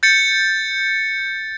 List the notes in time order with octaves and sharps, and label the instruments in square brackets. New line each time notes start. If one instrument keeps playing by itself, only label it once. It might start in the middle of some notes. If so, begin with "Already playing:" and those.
[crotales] G6 A6 C#7